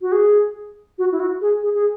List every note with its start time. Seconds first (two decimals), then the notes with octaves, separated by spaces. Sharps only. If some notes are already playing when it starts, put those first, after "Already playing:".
0.01 F#4
0.12 G#4
0.98 F#4
1.12 E4
1.20 F#4
1.41 G#4
1.63 G#4
1.74 G#4